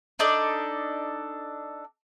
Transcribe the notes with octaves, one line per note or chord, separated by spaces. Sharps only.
D4 D#4 A4 D5